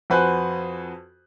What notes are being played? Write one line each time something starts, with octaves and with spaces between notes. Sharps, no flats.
F2 F#4 B4 C5 G#5 F#6